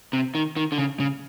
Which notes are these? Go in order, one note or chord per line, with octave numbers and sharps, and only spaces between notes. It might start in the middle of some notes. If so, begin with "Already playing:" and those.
C3
D#3
D#3
D3
C#3
C#3